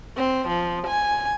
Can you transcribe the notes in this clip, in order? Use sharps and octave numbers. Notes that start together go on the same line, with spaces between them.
C4
F3
G#5